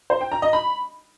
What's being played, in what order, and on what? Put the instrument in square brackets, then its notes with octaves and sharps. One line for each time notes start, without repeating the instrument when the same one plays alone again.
[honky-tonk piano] C5
G5
A#5
D#5
B5